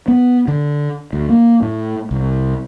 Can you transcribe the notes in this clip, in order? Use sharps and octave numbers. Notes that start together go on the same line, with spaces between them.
B3
D3
D2
A#3
A2
C2